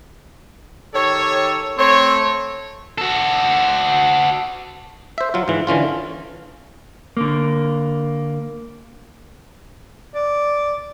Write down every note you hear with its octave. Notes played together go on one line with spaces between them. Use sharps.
D#3 G4 A4 C#5
A3 C4 C#5
F#4 A4
C5 E5
F#3 F4
G#2 E3
D3 E3 C#4 F4
D3 A#3
D5